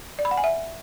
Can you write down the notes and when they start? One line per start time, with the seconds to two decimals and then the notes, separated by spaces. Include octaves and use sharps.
0.19 D5
0.25 B5
0.31 F#5
0.38 G#5
0.44 E5